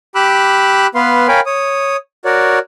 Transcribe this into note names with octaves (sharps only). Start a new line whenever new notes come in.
G4 B5 D6 E6 F#6
B3 B4 F5 C6
A#4 C#5 F5 G5 G#5 B5
C#5 D#6
F#4 A#4 C#5 D5